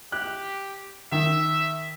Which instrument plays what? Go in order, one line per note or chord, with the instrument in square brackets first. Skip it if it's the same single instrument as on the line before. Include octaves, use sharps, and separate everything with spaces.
[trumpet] G4 [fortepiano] F#6
[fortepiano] D#3 [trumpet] E5